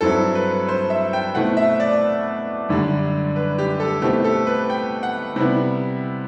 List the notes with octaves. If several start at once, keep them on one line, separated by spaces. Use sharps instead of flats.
G2 F#3 C4 E4 A4
B4
C5
E5
G5
B2 A3 C4 E4 F#5
E5
D5
F#2 D3 G3
B4
G4
A4
B2 A3 C4 E4 G4
A4
B4
G5
F#5
C3 G3 B3 E4